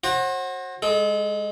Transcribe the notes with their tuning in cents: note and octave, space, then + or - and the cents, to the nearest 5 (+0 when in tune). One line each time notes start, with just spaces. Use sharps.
F#4 +0 C5 +40
G#3 -5 A4 -35